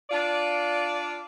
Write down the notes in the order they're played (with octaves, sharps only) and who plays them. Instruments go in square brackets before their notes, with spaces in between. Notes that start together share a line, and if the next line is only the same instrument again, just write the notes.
[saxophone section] D4 F4 D5